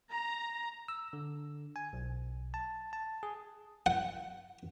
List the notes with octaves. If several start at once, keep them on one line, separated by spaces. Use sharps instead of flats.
A#5
E6
D3
G#5
B1
A5
A5
G#4
F#5